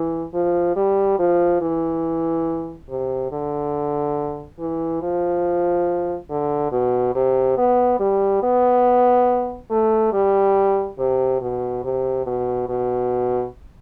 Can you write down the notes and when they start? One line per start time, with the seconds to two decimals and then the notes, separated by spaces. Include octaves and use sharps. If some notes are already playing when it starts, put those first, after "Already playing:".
Already playing: E3
0.34 F3
0.76 G3
1.19 F3
1.61 E3
2.90 C3
3.32 D3
4.60 E3
5.02 F3
6.30 D3
6.72 B2
7.15 C3
7.58 B3
8.00 G3
8.43 B3
9.71 A3
10.13 G3
10.99 C3
11.42 B2
11.84 C3
12.27 B2
12.69 B2